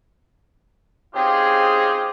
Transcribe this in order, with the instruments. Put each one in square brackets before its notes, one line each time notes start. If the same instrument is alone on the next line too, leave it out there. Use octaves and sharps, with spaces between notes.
[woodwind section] C#3 C4 D#4 F4 G4 G#4